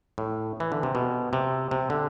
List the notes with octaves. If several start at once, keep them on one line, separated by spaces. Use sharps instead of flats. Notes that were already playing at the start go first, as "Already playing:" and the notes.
A2
E3
D3
C3
B2
C3
C3
D3